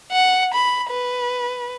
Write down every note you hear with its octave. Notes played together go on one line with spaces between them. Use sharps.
F#5
B5
B4